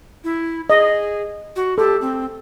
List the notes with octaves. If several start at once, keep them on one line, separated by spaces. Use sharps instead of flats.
E4
G#4 D#5
F#4
G4 A4
C4